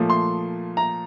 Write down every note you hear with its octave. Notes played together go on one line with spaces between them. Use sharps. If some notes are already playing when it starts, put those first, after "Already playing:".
Already playing: A#2 F3 A3
C6
A#5